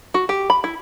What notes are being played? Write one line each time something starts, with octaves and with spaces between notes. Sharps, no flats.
F#4
G4
B5
E4